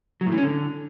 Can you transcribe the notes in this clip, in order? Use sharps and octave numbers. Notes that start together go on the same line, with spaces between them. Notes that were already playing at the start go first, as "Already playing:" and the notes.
F#3
A2
E3
C#4
D3